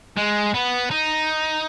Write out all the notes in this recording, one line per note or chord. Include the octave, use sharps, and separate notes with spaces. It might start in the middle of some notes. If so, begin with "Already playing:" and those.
G#3
B3
D#4